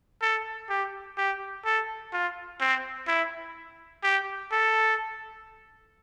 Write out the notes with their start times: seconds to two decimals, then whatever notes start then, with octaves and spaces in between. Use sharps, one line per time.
0.22 A4
0.69 G4
1.18 G4
1.65 A4
2.13 F4
2.61 C4
3.08 E4
4.03 G4
4.52 A4